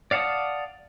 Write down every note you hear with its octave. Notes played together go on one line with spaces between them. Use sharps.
D5 F5 F#5 A5 D#6